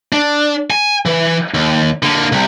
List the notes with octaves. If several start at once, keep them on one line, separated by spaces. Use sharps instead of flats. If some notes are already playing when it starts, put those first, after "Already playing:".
D4
G#5
E3
D#2
D3 A#3
C2 C3